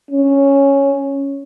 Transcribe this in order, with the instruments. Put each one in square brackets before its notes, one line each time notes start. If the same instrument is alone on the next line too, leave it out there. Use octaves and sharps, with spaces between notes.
[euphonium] C#4